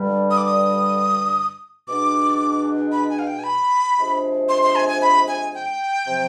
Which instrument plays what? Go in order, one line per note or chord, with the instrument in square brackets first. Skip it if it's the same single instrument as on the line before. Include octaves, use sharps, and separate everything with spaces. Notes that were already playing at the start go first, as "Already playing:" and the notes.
Already playing: [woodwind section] G2 D3 G3 D4
[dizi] D#6
D6
D#6
[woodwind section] B2 G#3 D4 [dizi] D6
[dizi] B5
G#5
F5
G5
G#5
B5
[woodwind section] C3 F3 G#3 D4
[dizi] C6
C6
G#5
G#5
B5
G#5
G5
[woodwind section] C3 F3